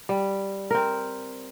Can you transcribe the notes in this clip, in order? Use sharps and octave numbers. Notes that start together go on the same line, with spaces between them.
G3
C4 A#4